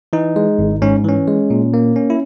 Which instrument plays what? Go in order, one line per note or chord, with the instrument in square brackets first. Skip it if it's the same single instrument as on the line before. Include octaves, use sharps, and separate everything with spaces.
[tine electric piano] E3 D#4
G#3
G#1
G#2 C#4
E3 C#4
G#3
A#2
A#3
C#4
E4